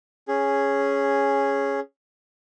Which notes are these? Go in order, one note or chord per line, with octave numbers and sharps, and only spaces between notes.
C#4 G#4